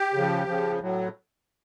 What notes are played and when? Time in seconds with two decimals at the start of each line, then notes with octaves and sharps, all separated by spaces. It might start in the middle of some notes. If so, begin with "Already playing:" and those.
Already playing: G4
0.14 C#3 F3
0.47 C#3 F3
0.80 A2 F#3